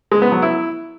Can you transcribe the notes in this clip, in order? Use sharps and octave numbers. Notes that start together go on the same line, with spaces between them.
G#3
B3
F#3
E4